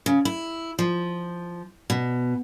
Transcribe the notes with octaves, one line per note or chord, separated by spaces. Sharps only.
C#3
E4
F3
B2